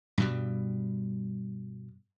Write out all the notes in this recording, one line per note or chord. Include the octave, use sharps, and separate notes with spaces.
G2 B2 G3